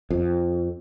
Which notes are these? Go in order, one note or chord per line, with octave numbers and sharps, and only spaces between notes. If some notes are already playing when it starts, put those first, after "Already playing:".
F2